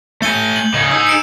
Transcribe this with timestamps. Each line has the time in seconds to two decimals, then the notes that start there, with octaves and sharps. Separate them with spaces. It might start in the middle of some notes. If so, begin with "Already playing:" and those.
0.22 A3 G#5 G6 C#7 G7
0.56 F#7
0.74 C#3 D#4
0.91 D#4 G#4 E6
1.07 C#7 D7 E7